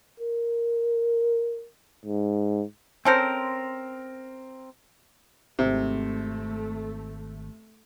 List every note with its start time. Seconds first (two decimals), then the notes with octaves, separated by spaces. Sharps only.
0.20 A#4
2.06 G#2
3.05 C4 C#4 A4 A#4 C5
5.59 G#1 C3 A3